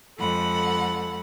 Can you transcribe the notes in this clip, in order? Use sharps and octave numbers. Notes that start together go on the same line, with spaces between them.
F2 G#3 A4 F#5 B5